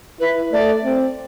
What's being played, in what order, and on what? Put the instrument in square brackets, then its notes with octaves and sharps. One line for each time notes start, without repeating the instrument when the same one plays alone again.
[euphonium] E4 [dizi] B4
[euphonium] A3 [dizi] D5
[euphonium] C4